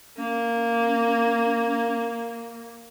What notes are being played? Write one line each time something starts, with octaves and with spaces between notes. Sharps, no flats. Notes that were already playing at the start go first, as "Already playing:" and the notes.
A#3 C#4